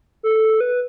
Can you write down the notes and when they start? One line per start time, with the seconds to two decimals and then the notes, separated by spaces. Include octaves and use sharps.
0.23 A4
0.61 B4